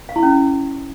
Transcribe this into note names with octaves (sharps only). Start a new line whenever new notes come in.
F5
E4
C#4